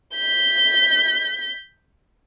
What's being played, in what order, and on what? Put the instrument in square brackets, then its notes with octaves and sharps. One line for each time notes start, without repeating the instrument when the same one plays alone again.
[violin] G6 B6